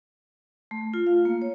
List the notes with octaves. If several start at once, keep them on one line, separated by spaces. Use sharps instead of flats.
A3
F4
F5
A#3
C#5